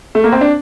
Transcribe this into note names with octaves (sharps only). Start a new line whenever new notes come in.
A3
A#3
C4
D4